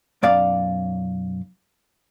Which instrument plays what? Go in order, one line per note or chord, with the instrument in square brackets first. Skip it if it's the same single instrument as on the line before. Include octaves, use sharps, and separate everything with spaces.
[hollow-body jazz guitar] B1 F#2 D5 F5